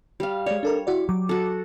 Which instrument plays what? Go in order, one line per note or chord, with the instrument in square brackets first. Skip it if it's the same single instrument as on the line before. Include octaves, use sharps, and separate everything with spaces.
[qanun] G3 F5
[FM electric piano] G#3 D5 [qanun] C#5
[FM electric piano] D4 A4 A#4
E4 F#4 D5
[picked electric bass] F#3 [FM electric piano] D6
[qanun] F#4 A4